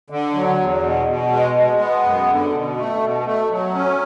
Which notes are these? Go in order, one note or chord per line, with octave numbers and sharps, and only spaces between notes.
D3
F#3
E2
B2
B2
G#3
G#3
B3
F#2
D3
B2
A3
B2
A3
F#3
C#4